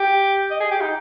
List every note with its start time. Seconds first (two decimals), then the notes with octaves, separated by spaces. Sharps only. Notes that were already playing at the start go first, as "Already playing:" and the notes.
Already playing: G4
0.51 D#5
0.60 G#4
0.71 G4
0.81 D#4